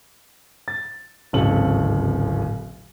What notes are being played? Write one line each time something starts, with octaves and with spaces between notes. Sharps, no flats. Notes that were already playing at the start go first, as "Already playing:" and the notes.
A6
D1 G#1 C#3 A4 F#7